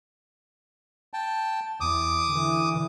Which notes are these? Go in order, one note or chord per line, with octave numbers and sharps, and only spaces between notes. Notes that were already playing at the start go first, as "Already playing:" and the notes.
G5 A5
E2 D6 D#6
D3 E3